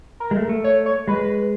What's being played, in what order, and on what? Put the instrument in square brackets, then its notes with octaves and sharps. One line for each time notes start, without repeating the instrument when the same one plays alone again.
[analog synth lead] A#4
[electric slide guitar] G#3
A3
A3
[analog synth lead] C#5
C#5
[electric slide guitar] G#3 [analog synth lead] B4